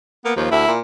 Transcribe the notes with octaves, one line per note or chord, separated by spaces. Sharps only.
A#3 B3
D#2 F3
D2 E4
A#2